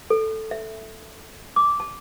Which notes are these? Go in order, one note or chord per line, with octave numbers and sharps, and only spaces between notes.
A4
E5
D6
A5